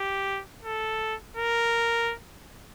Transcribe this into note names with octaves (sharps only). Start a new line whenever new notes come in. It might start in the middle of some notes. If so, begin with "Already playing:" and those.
Already playing: G4
A4
A#4